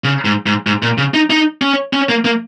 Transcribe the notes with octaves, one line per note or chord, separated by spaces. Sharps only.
C#3
G#2
G#2
G#2
A#2
C#3
D#4
D#4
C#4
C#4
A#3
A#3